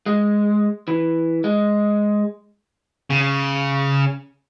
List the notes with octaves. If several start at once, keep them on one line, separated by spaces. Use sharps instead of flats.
G#3
E3
G#3
C#3